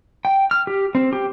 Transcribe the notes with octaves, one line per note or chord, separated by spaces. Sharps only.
G5
F6
G4
C4
G4